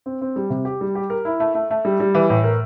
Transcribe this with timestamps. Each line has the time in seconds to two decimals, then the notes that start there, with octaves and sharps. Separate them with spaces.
0.06 C4
0.21 C4
0.36 G3
0.50 C3
0.65 G4
0.81 G3
0.95 G4
1.10 A#4
1.25 E4
1.40 A3
1.55 A3
1.70 A3
1.85 G3
2.00 G3
2.15 E3
2.30 A2
2.44 A#4